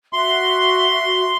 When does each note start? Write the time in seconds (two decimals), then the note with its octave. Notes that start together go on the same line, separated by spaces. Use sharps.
0.13 F#4 E5 C6